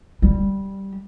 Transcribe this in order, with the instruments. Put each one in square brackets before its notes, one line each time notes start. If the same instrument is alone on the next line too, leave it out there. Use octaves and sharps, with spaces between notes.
[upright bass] G3